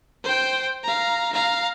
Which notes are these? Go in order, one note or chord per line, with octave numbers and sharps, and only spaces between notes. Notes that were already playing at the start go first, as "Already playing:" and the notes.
C5 G5
F5 A#5
F5 A#5